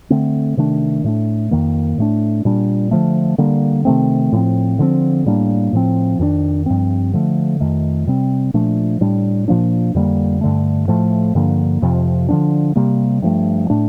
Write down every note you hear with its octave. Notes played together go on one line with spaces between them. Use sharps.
D3 A3 C4
C3 D#3 A3 D4
A2 A3 D4
F2 D#3 A#3
A2 A3 D4
A#2 G3 D4
D3 F3 A3
D3 G3 A#3
C3 D#3 A3 C4
A2 F3 C4
D3 F3 A3 C4
A2 G3 A#3 D4
A2 F3 C4
F2 D#3 A#3 D4
G2 F3 C4
D3 F3 A3
F2 D#3 A3
C3 G3 C4
A#2 F3 A3 D4
A2 G3 D4
A#2 F3 A#3 D4
F2 D3 G3 A#3
G2 D3 A3
A2 F3 A3
G2 D3 F3 A#3
F2 C3 F3
D3 F3 A#3 D4
C3 G3 A#3
G2 F3 A3
A2 A3 D4